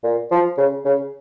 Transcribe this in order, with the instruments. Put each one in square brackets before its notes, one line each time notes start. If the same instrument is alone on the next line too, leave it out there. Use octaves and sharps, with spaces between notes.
[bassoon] A#2
F3
C#3
C#3